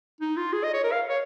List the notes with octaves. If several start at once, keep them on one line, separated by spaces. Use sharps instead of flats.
D#4
F4
G#4
D#5
C#5
A#4
F5
C#5